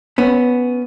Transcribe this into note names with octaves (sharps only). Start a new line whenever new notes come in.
B3 C#4